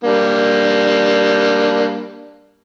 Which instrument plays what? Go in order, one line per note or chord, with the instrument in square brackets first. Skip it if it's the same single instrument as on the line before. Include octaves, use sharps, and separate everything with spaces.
[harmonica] G3 A#3 D4